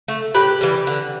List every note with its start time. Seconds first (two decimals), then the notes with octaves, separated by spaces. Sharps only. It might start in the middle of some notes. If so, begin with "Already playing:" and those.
0.08 A3
0.34 A2 G4 B4
0.61 E3 G3
0.87 D3